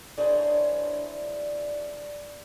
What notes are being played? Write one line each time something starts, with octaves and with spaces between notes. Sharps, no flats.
D4 E4 G#4 A#4 C5 C#5